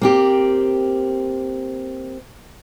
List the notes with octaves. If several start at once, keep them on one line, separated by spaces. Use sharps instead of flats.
A#3 C4 G4